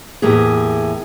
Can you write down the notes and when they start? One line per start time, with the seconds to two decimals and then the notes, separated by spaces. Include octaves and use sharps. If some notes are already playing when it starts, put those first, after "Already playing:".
0.22 E2 A2 A#3 G4 G#4